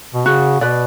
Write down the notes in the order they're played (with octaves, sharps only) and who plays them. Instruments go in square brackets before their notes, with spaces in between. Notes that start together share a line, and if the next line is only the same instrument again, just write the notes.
[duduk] B2
[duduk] C#3 [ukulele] F#4
[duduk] B2 [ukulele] B4 D5